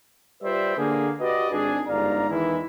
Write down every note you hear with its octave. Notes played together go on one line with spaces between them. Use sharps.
G3 F4 B4 C5 D5 E5
D3 A#3 G#4
F#4 G4 B4 D5 D#5
G#1 D4 G#4
G1 G#2 D5 F5 A#5
E2 D#3 E3 G#3 E4